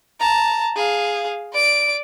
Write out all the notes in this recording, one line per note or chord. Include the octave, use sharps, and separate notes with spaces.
A5 A#5
G#4 F5
D5 D7